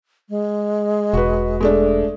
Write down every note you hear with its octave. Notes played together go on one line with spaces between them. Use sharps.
G#3
E1 F#4 B4
G#3 A3 D4